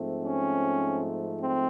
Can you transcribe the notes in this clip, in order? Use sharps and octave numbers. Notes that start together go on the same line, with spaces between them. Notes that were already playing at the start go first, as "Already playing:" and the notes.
Already playing: G#2 F3 A3 C4
C#4
C4